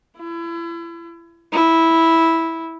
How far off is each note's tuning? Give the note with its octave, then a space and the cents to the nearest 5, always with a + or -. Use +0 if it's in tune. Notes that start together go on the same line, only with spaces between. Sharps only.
E4 +35
E4 -10